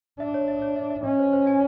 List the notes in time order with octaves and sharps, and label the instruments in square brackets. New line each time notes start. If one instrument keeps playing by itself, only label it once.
[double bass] D4 [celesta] E5
[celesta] C#5
E5
C#5
E5
E5
[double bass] C#4 [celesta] D#5
[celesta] C5
C5
G#5